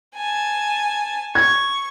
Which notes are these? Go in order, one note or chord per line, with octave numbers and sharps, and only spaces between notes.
G#5 A5
C#6 G#6